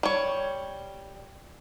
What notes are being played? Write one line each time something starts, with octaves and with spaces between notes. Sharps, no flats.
G3 C#5